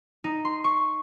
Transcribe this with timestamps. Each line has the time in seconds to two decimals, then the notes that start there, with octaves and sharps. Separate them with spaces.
0.24 D#4
0.45 C6
0.64 C#6